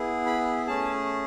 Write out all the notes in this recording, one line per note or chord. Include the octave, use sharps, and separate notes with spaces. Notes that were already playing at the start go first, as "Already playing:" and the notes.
Already playing: B3 E4 G#4
B5
A3 C#4 G#4 A5